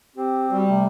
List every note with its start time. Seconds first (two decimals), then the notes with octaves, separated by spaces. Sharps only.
0.16 C4 G4
0.51 G3 F#4
0.68 C3 A3